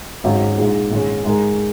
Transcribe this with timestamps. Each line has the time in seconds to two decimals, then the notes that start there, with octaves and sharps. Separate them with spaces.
0.24 G#1 G#2 F#3 C#4 F#4
0.58 A#1 G#2 G#3 F#4
0.91 A#1 G#2 D#3 G#3 C#4
1.24 G#2 G#3 D#4 A#4